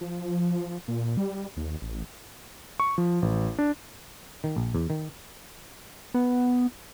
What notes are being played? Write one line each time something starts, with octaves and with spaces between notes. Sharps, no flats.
F3
A#2
G3
D#2
A1
C#6
F3
A1
D4
D#3
A#1
E2
D#3
B3